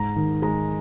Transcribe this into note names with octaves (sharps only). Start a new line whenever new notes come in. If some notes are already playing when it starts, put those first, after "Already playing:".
Already playing: G#2 A#5
D#3
G#3 A#5